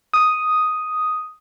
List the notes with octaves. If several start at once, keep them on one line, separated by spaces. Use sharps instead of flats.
D#6